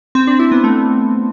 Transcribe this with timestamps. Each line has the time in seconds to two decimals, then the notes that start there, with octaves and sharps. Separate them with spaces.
0.15 C4
0.27 D4
0.39 E4
0.52 B3
0.64 A3